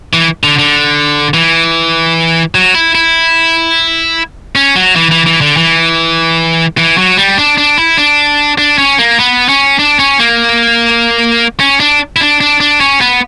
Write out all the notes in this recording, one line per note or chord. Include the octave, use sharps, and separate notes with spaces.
E3
D3
D3
E3
F#3
E4
E4
C#4
F#3
E3
E3
E3
D3
E3
E3
F#3
G3
D4
D4
E4
D4
D4
C#4
A#3
B3
C#4
D4
C#4
A#3
C#4
D4
E4
D4
D4
D4
C#4
B3